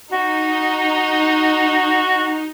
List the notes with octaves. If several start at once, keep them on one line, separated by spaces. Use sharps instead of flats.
D#4 F#4